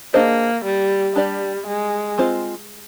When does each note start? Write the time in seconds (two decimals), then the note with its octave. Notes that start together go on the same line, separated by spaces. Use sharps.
0.14 A#3 D4 G#4 C5 D#5
0.65 G3
1.16 G3 D4 G4 D5
1.67 G#3
2.18 G#3 C4 F4 C5 D#5